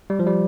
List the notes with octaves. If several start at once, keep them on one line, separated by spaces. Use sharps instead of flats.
G3
F3
G3